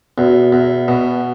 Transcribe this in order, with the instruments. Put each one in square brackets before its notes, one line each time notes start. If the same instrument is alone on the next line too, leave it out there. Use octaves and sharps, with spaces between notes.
[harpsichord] E2 [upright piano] B2
[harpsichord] E2
B2